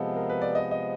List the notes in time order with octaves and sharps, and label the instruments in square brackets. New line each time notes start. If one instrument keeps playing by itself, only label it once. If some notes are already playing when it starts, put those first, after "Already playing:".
Already playing: [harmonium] C3 F3 G#3 B3 [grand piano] A4
[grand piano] A#4
B4
D5
D#5
D#5